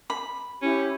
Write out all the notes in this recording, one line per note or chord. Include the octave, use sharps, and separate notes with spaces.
B5
C#4 E4 G4 C#5